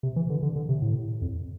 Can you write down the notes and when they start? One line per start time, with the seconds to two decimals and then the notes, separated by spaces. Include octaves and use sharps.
0.03 C3
0.16 E3
0.30 D3
0.43 D3
0.56 D3
0.69 C3
0.82 A2
1.22 F2